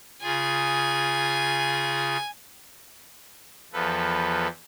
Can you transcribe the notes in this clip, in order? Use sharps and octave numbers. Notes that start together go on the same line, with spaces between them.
C#3 F4 G#4 G#5
E2 F3 A4 B4